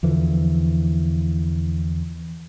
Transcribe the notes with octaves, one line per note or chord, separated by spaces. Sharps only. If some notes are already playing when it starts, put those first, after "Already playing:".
E2 D3 E3 F3